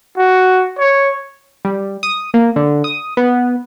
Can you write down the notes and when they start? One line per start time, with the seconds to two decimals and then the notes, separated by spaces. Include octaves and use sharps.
0.18 F#4
0.79 C#5
1.65 G3
2.03 D#6
2.34 A#3
2.56 D3
2.84 D#6
3.17 B3